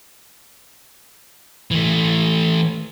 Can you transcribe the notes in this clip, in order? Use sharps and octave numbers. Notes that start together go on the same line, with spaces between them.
E3 A3